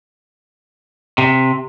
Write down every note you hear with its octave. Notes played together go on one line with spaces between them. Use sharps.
C3